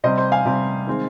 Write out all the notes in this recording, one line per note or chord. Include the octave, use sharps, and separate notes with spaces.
C3 G3 C4 C5 D#5
C5
F5 G#5
C3 G3 C4
D#3 G#3 C4